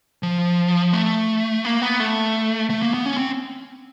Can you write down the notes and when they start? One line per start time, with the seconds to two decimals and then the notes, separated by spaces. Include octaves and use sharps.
0.23 F3
0.93 A3
1.65 A#3
1.81 B3
2.00 A3
2.70 A3
2.82 A#3
2.94 B3
3.06 C#4
3.17 C4